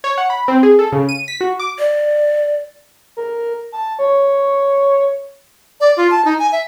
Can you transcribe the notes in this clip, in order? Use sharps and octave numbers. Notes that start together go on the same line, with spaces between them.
C#5
F#5
B5
C4
G#4
A4
C#3
D#7
B6
F#4
D6
D5
A#4
A5
C#5
D5
F4
A5
D#4
G#5
E5